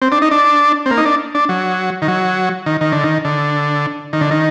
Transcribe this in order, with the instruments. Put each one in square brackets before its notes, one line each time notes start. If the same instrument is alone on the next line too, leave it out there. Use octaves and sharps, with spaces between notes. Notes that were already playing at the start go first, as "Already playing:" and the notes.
[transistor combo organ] C4
D4
D#4
D4
C4
A#3
D#4
D4
D4
F#3
D#3
F#3
D#3
D#3
D3
D#3
D3
D#3
D3
D#3